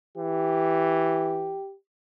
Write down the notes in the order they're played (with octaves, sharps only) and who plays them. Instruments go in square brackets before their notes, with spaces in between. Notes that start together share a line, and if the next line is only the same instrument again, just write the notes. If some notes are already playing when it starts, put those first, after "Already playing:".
[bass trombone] E3 [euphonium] G4